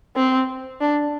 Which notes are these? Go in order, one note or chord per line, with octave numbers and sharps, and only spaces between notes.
C4
D4